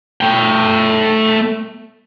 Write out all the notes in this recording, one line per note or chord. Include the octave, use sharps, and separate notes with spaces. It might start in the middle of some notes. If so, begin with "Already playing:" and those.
A3 G5